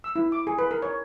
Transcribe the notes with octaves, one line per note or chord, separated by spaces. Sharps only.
E6
E4
D6
G#4
B4
A#4
C#5